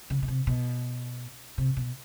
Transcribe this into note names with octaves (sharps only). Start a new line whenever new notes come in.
C#3
B2
C3
B2
C3
B2